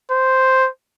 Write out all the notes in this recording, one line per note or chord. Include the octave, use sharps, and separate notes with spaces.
C5